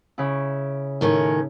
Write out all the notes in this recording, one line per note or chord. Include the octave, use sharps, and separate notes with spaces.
C#3 E4
A2 D#3 C#4